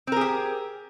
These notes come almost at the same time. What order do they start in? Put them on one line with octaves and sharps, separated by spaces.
C4 A#4 G#4 G4